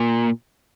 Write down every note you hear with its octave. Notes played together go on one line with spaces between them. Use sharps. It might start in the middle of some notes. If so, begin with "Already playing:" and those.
Already playing: A#2